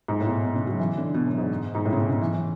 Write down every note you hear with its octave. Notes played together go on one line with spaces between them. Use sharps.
G#2
A2
B2
B2
C#3
F#3
E3
D3
B2
F#2
G#2
G#2
A2
C#3
B2
C#3
E3
E3